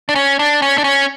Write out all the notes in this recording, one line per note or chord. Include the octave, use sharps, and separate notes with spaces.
D4
C#4
D4
C#4
D4
C#4